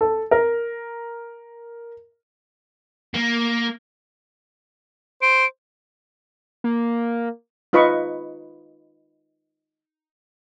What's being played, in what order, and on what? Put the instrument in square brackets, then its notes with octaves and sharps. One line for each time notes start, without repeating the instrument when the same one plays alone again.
[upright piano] A4
A#4
[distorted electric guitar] A#3
[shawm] C5 [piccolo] D7
[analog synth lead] A#3
[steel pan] D#4 F4 B4 D#5 B5 C#6